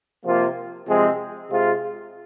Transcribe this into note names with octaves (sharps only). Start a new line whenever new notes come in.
C3 F3 A#3 F4
C3 F3 G#3 C4
C3 G#3 F4